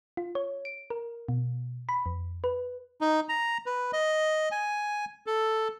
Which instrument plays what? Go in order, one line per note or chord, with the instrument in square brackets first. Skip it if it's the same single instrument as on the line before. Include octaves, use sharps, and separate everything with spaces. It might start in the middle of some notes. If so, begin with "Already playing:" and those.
[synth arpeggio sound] F4
C#5
D7
A#4
B2
B5
F2
B4
[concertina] D#4
A#5
B4
D#5
G#5
A4